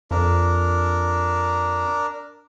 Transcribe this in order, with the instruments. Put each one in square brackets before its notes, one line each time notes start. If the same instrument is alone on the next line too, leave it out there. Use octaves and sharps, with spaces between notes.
[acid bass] F2 [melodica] D4 A#4